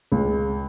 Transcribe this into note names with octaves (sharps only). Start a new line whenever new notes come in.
C#2